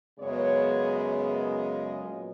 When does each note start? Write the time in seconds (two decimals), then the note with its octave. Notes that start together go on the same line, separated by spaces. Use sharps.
0.19 F#2 C#3 G#3 B3 C#5
1.10 D#5
2.02 A#2 F#3 B3